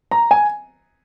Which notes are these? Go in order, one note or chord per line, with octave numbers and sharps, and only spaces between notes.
A#5
G#5